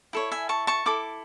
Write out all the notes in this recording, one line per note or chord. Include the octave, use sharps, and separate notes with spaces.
E4 A4 C#5
E5 G#5
A5 C#6
A5 C#6
E4 A4 D6